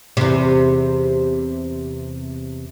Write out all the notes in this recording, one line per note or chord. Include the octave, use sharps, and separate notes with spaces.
E2 C3